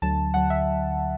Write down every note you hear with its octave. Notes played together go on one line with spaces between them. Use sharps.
D2 D3 F#3 A5
D2 D3 F#3 F#5
E5